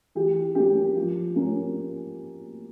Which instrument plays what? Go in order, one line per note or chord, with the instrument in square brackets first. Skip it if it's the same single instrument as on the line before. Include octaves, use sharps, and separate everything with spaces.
[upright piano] E3 G4
A#3 C#4 G4
F3
A#3 C#4